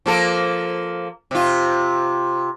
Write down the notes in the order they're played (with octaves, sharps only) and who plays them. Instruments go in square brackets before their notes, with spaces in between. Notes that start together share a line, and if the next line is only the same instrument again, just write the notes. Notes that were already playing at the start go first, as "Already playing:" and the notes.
[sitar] F3 A#3 A4
C3 F4